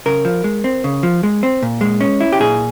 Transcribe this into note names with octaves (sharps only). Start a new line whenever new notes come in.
C#3 A#4
F3
G#3
C4
C#3
F3
G#3
C4
A#2
G#3
C#4
E4
G4
A#2 G#4